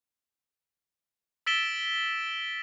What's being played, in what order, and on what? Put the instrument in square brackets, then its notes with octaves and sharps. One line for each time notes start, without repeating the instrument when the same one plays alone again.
[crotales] E6 A6 B6 D7 E7 G7